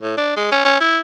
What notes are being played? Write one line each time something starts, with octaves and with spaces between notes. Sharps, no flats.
A2
D4
G#3
C#4
C#4
E4